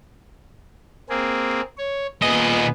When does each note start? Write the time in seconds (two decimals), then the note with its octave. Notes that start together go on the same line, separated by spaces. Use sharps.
1.10 A#3 C4 G#4
1.78 C#5
2.22 A#2 B3 G#4 D#5